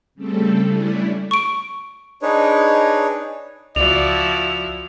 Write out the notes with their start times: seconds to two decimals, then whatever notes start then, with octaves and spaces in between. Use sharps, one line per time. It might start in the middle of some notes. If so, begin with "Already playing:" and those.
0.15 C#3 G3 A3 C4 A4
0.65 G3 A3 C#4 D4 E4
1.31 C#6 D7
2.22 D4 D#4 G#4 B4 C#5
3.76 C#2 F3 E4 F#4 D5 F7